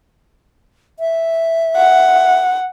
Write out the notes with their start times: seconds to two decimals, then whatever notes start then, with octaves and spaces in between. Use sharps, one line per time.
1.00 E5
1.77 F#5